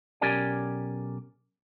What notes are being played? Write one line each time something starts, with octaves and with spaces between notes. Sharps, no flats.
B1 C#4 G4 A#4 D5 G#5